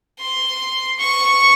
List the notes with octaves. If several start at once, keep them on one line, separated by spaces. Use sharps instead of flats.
C6
C#6